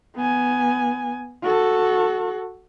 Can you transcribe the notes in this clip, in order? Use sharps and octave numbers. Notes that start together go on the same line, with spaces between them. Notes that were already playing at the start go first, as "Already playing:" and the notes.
B3 G#5
F#4 A4